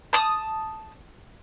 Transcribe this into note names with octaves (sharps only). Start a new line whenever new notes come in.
A5 D#6